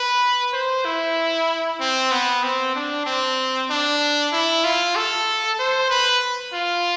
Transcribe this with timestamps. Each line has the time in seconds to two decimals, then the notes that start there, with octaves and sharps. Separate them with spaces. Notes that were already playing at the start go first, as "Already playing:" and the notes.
Already playing: B4
0.53 C5
0.85 E4
1.80 C4
2.12 B3
2.43 C4
2.75 D4
3.06 C4
3.70 D4
4.33 E4
4.64 F4
4.96 A4
5.59 C5
5.90 B4
6.53 F4